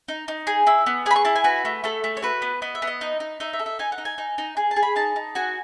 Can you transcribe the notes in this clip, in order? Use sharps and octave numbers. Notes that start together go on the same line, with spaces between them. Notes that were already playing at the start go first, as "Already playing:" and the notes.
D#4
D#4
G#4
E4 E6
B3
G#4 B5 D#6
C#6
E4 A5
G#5
F#4 B4
A3
A3 A4
A3
C#5
F#4 B4
B3
B3 D#5
E5
B3
D#5
D#4
D#4
D#4 E5
E5
A4
E5
D#4 G#5
F#5
D#4
G#5
D#4
D#4
G#4
A5
G#4
B5
D#4 A5
D#4
F#4 G#5